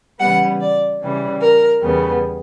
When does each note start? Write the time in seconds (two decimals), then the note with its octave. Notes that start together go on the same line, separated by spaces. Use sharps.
0.20 C#3 E3 G3 B3 F#5
0.60 D5
1.01 C#3 E3 G3
1.41 A#4
1.81 E2 C#3 G3 B3